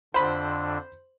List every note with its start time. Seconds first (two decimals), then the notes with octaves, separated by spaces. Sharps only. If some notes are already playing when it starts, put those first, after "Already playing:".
0.14 F2 D3 D4 C5 B5